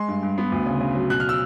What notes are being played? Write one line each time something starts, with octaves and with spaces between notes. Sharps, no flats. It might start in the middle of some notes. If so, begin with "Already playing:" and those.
Already playing: G#3 C6
G2
G2
B3
D2
C#3
C#3
F#3
B2 F#6
F6
E6